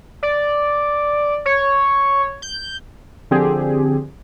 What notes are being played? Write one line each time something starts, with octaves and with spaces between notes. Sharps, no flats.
D5
C#5
G6
D3 F3 C4 G4 G#4